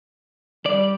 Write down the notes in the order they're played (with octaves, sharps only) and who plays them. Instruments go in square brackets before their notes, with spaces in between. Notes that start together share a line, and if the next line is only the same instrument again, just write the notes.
[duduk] G3 [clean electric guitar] D5